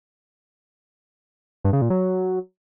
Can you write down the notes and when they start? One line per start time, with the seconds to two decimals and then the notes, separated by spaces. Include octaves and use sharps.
1.64 G2
1.73 C#3
1.82 A#2
1.90 F#3